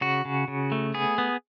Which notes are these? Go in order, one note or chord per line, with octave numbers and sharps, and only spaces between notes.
C#3 F#4
C#3
C#3
A3
B3 G#4
B3